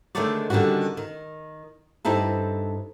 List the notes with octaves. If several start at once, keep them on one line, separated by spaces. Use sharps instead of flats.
D3 D#3 G#3 A3 C#5 D5
D3 D#3 G3 C#4 F#4
D#3
G2 C4 D#4 E4 A4